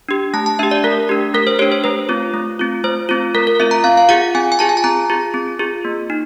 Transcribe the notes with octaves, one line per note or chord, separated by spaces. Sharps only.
D4 G4
A3 A5
A5
D4 G4 E5
D5
A3 A#4
D4 G4
A3 A#4
C5
D4 G4 C#5
C5
A3 B4
C4 F4
A3
C4 F4
A3 C5
C4 F4
A3 A#4
A#4
C4 F4 E5
A#5
C4 F5
F5
F4 G#4 F#5
C4 G#5
G#5
F4 G#4 A5
G#5
A5
C4 A#5
F4 G#4
C4
F4 G#4
A#3
D#4